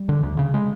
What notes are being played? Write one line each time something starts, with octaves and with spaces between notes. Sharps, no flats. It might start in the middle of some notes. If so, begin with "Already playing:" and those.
Already playing: G3
D3
D2
C#3
G#3